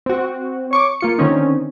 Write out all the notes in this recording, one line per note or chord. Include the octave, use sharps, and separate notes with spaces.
C4 F#4
C#5 C#6 D6
A#3 F4 C#7
D3 D#3 C4 C#4 D#4